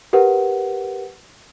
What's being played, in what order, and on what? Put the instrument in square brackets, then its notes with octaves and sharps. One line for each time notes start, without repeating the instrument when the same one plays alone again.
[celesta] G4 A#4 B4 F#5